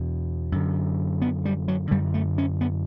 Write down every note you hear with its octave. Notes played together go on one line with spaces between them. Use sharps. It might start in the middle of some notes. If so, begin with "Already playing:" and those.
Already playing: E2 B2
F#2 D3
B3
G3
F#3
F#2 D3 G3
A3
C#4
B3